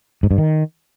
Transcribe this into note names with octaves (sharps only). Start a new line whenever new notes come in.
G#2
G2
D#3